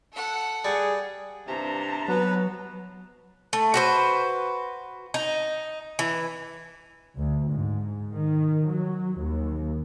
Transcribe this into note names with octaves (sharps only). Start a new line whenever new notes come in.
A4 F#5
G3 G#4
G2 C3 A5 A#5
F#3 B3 B4
A3
F#4 B4 C5
D#4
E3
D2
G#2
D#3
F#3
D#2